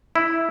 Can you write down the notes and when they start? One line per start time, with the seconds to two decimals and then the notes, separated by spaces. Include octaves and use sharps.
0.16 E4